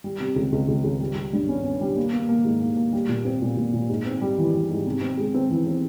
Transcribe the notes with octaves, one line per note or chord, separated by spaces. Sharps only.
G3
C3
C#2
C#2
C#2
C#2
G3
G3
G2
C#4
C#4
G3
A#3
A#3
A#3
G#2
A#3
A#3
G3
A#2
C4
A#2
A#2
A#2
G#2
C4
G3
E3
G3
G#2
C3
C4
G#3
C4
E3
C4